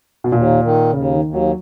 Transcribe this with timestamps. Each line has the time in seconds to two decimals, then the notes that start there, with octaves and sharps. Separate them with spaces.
0.24 B2
0.32 D#2 A#2
0.63 D#3
0.93 D#2 C#3
1.14 D#3
1.25 D#2
1.34 F#3